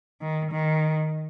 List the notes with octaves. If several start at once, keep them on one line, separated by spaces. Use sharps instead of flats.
D#3
D#3